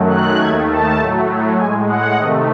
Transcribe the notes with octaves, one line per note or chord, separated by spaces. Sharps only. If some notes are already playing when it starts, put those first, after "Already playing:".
Already playing: F#2 D#3 F#3 A3
F#6
D#2 D#3 A3 G#6
A5
A2 F#3 A3
A2 G#3 G#5
F#5
C3 D#3 A3 D#5